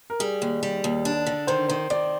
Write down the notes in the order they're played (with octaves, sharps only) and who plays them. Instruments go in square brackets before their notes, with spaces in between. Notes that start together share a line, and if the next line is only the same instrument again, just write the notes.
[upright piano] A#4
[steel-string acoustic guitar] G3 [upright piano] G#4
[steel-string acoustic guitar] D#2
G3
D#2
D4
D3
[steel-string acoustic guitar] D#3 [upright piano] C5
[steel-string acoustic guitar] D#3 [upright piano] C5
[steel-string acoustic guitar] D#3 [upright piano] D5